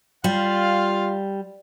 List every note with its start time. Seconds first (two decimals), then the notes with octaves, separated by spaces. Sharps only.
0.24 G3 F4 F5